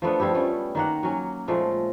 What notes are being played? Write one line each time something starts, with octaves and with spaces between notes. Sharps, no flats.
F3 A3 B3 D4
F3 G3 E4 G4
G3 A3 C#4
D#3 A#3 F#5
F#3 C#4
A#2 F3 G#3 A3